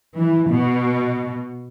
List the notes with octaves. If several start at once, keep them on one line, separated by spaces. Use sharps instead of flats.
E3
B2